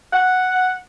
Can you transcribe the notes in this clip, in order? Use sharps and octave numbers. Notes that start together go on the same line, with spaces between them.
F#5